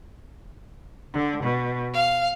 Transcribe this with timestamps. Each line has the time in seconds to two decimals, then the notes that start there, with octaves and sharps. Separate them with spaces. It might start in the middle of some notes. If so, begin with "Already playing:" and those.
1.14 D3
1.43 B2
1.92 F5